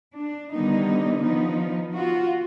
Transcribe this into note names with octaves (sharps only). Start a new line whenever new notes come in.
D4
D3 D#3 G3 B3 D#4
F3 B3 D#4
F4 F#4